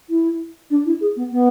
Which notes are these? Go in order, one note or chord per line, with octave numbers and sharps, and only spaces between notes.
E4
D4
E4
G#4
B3
B3